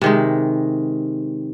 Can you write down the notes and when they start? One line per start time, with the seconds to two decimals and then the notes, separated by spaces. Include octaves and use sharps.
0.02 C3 D#3 G#3